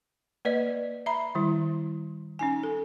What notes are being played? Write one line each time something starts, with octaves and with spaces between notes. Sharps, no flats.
A#3 B4 D5 D#5
E5 A#5 B5
D#3 G3 E4
C#4 D#4 G#5
A4